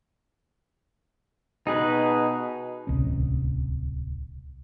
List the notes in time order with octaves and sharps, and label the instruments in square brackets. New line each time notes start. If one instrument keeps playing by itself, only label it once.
[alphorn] B2 [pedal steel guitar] D#4 G#4 B4
[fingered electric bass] D1 C2 C#4